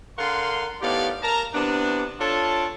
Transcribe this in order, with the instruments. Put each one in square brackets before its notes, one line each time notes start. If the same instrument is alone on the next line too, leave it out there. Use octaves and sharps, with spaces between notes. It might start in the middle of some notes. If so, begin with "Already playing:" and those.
[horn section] D3 A#4 F5 F#5 C6
A2 D#3 B3 G4 D5 F5
A#4 A5 A#5
C3 E3 B3 D4
D4 F4 A4 C#5 A5